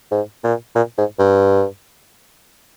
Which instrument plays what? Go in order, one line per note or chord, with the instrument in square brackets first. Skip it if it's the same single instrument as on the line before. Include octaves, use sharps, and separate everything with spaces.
[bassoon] G#2
A#2
A#2
G#2
G2